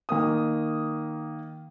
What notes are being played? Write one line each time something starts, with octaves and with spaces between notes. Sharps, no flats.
D#3 A#3 D#6